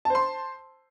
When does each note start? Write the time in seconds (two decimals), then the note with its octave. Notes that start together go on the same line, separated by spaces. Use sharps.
0.05 A5
0.10 C5
0.15 C6